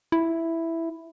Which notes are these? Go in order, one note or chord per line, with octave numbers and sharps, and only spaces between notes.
E4